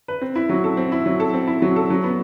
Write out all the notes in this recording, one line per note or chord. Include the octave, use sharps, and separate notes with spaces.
B4
C4
E4
F#3
A4
C4
E4
F#3
A4
C4
E4
F#3
A4
F#3
B3